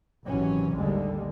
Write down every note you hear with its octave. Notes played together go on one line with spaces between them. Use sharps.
G#1 C3 E3 F#3 C#4
A1 D#2 D3 G3 G#3